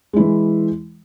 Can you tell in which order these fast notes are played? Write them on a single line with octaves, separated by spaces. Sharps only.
G#3 E4 E3